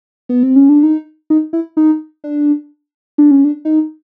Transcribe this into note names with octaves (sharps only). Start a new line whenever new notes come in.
B3
C4
C#4
D4
D#4
D#4
E4
D#4
D4
D4
C#4
D4
D#4